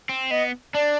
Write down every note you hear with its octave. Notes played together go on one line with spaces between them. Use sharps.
C4
B3 D#5
D4 D5